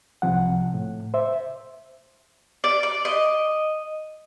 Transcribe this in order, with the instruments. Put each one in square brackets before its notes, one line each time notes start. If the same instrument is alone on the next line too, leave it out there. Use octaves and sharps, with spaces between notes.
[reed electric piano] C2 C3 F3 F#5
A2
C5 E5
[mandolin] D5
D5
D#5